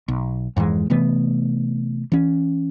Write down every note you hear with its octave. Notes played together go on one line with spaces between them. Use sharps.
B1
F2 G#2 E3 G#3
C3 E3 A3 B3
E3 C#4